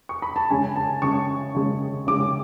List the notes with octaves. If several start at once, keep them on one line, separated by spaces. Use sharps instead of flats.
C#6
B5
A5
C#3 G#3 C#4 G#5
A5
C#3 G#3 C#4 C#6
C#3 G#3 C#4
C#3 G#3 C#4 D6